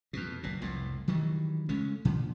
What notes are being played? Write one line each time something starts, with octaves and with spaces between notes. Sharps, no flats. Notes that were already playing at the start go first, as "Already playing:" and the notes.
F2 B2
F#1 A#2
F1 C2 A2
D#3 E3 F#3 G3
C#3 G#3 A3 C#4
A#2 D3 F3